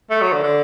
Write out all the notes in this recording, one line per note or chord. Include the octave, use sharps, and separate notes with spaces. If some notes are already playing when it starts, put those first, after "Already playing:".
A3
F#3
D3
D3